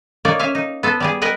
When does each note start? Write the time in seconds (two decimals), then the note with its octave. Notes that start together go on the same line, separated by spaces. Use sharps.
0.25 A#3 D#4 C#5 D5
0.39 C#4 E5 F5
0.55 D#4
0.83 B3 A4 C5
1.00 G3 G4 G#4
1.21 A#4 B4 D#5 F#5 G5